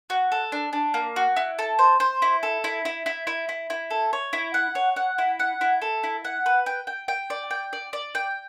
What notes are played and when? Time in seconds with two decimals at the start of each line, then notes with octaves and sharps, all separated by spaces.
0.10 F#4
0.32 A4
0.52 D4
0.73 D4
0.94 A#3
1.16 F#4
1.37 E4
1.59 A4
1.79 C5
2.00 C5
2.22 E4
2.43 A4
2.64 E4
2.85 E4
3.06 E4
3.27 E4
3.49 E4
3.70 E4
3.90 A4
4.13 C#5
4.33 E4
4.54 F#5
4.75 C#5
4.96 F#5
5.18 E4
5.40 F#5
5.61 E4
5.82 A4
6.03 E4
6.25 F#5
6.46 B4
6.66 G5
6.87 G5
7.08 G5
7.30 D5
7.51 G5
7.73 D5
7.93 D5
8.15 G5